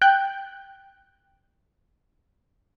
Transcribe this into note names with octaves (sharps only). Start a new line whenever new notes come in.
G5 F#6 G6